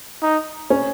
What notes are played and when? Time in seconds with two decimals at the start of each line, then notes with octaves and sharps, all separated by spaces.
0.22 D#4
0.70 C#4